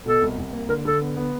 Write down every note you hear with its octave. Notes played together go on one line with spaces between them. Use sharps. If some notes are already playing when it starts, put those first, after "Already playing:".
B2 A4
C2
C2
A#3
D3 A#4
D3 A4
B3
B3